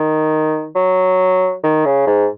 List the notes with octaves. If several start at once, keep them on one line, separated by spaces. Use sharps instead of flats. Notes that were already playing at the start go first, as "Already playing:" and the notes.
Already playing: D#3
F#3
D#3
C#3
G#2